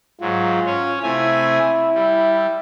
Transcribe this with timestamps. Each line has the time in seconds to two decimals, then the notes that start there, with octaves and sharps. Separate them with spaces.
0.21 G#2 F#3 F4
0.66 C#4 C#5
1.03 C3 A3 E4 G#5
1.95 G3